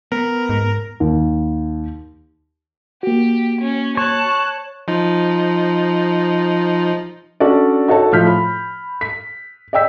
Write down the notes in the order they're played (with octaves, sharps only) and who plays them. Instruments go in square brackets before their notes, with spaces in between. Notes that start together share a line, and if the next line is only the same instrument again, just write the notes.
[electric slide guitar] B3 [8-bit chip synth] A#4
[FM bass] G#2
[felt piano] D#2
[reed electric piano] A#3 F#4 [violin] G4
[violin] C#4
[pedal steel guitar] C#5 [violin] A5 F#6
[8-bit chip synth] F3 D#4
[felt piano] C#4 D4 F#4 A4 D5
D#4 F#4 A4 C#5 A5
A2 F3 F6 G6 B6
B5
B6
D5 D#5 G5 E6 B6